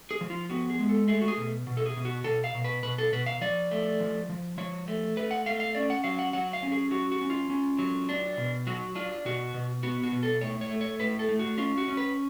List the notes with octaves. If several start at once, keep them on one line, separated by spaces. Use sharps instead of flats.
G#4
F3
F4
B3 F#4
G#4
G#3
A4
A3 G#4
F#4
G#4
B2
B2
A4
G#4
B2
F#4
B2 A4
F5
B2
B4
B2 B4
A4
B2 B4
F5
F3 D5
A3
F3
F3
F3 C#5
A3
A3 B4
F#5
A3 F5
F5
C#4 D5
F#5
F#3 F5
F#5
F#3 F#5
F5
C#4
G#4
F#3 F#4
F#4
C#4
F4
C#4
F#3
D4
B2
F#3 F#4
D4 F4
B2 F#4
B2
B3 F#4
F#4
B2
A4
A2 C#5
C#5
A3
C#5
A2 B4
A4
A3
F#4
C#4 F4
F#4
C#4
B4